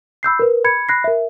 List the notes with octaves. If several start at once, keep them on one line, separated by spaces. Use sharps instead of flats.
B5 E6 G6 C7
A#4 B4
B5 G#6 C#7
B5 F#6 A#6 C7
A#4 E5